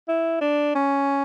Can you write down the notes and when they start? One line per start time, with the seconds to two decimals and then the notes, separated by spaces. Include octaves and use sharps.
0.08 E4
0.41 D4
0.75 C#4